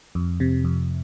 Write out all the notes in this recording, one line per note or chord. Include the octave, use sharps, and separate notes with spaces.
F2
C3
F2